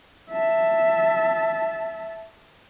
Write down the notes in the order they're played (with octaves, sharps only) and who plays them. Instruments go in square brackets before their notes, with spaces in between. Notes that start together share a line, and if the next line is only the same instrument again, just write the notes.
[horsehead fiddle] E5 A5